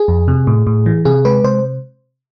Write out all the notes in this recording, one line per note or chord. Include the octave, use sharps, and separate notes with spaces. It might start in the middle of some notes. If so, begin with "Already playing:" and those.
Already playing: G#4
F2
C3
A2
A2
E3
C3 G#4
G#3 B4
C3 C5